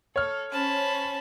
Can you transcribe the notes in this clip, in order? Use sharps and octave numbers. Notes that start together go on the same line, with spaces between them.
A4 C#5 F6
C#4 C5 A5 B5